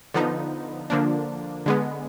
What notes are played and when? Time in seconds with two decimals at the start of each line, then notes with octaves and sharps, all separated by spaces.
0.14 D3 F3 B3 D#4
0.90 D3 F3 A#3 D4
1.66 D3 G#3 B3